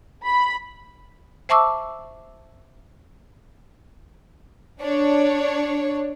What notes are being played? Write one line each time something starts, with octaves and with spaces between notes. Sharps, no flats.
B5
C5 E5 A5 C#6 D6 E6
D4 C#5